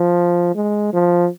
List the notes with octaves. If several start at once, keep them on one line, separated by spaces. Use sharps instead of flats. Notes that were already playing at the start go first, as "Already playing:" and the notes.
Already playing: F3
G#3
F3